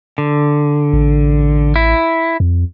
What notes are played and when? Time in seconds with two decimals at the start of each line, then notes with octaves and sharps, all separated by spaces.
0.18 D3
0.93 A1
1.76 E4
2.40 F2